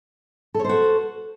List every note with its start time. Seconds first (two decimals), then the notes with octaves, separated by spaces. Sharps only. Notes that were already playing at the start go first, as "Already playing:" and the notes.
0.54 A4
0.59 C#5
0.64 C5
0.69 F#4